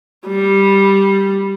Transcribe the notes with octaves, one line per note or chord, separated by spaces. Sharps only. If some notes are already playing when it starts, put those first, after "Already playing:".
G3